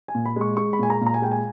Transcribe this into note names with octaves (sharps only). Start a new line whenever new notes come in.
G#5
A#2
B5
G#3 C#6
G#3 C#6
B5
A#2 G#5
A#5
A#2
A#5
G#5
G#3 G5
G#5